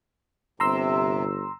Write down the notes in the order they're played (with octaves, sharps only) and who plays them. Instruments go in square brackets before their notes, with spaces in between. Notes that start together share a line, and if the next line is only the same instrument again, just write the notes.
[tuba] G1 [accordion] C3 [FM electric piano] A#5 C6 E6